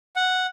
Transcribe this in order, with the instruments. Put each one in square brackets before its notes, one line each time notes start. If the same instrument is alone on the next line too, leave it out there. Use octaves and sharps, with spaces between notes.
[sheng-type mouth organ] F#5